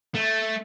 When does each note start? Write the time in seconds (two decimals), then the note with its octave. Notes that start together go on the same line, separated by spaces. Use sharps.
0.15 A3